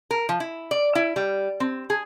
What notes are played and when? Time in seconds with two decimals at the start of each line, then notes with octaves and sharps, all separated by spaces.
0.11 A#4
0.29 F3
0.40 E4
0.71 D5
0.95 E4
1.16 G3
1.60 C4
1.90 G#4